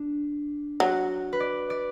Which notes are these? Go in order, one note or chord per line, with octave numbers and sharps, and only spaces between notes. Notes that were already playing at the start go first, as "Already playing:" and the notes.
Already playing: D4
F#3 F#4
B4
D5
D5